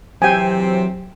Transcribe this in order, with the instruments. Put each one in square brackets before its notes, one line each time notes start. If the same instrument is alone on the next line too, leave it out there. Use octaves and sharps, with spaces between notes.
[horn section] C3 E3 C4 [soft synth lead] F#3 [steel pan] G5 G#5